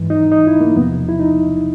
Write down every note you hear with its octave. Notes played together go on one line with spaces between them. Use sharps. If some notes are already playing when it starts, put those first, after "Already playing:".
Already playing: G#2 E3
D#4
D#4
E4
A#3
E2 C3 F3 B3
E4
D#4